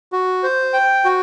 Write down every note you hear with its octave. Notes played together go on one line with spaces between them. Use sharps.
F#4
C5
G5
F#4